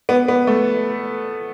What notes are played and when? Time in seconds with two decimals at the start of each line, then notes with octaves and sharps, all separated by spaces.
0.09 B3
0.28 B3
0.47 A3